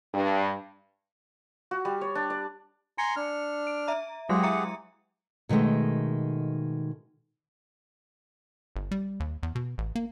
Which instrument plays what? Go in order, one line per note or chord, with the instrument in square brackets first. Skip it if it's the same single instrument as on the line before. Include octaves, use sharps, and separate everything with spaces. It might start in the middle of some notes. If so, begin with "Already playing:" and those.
[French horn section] G2
[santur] F#4
G3
C#5
D4
D5
[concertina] G#5 A#5 C6 [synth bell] C#7
[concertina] D4 F6
[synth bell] D7
E5 A#5
[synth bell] F#3 G#3 C6 [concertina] G4 G#4 F#5
[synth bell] E5 A#5 C#7
[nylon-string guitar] B2 D#3 G#3 A3 D#4
[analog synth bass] G1
G3
D#2
E2
B2
A1
A#3